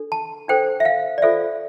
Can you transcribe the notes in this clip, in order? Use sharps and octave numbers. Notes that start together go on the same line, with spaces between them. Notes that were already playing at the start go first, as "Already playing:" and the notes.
Already playing: D4 A4
A5
D4 A4 C5 G5
E5
F5
D5
F4 A4 C5 E5